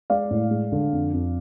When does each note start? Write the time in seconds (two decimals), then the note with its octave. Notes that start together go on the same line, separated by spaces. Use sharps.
0.10 G#3 D5 F5
0.30 A2
0.51 G#3
0.72 D3
0.92 F2
1.13 F2